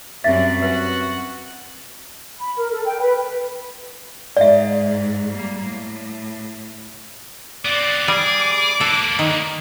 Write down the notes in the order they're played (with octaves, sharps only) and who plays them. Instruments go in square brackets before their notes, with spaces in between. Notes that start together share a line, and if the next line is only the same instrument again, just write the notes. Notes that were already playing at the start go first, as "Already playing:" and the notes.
[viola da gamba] F#2 F#3 G3 [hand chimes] C4 C#4 B6 [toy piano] E5 [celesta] A6
[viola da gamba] F#4 [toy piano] B4
[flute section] B5
A#4
A4
G5
B4
[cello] G#2 [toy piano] D5 E5
[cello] G3 A#3
A2
[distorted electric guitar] B3 C4 [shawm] D5 [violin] D6
[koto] G3 [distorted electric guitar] G#4
[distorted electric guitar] A#3 B4 [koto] A4
[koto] D#3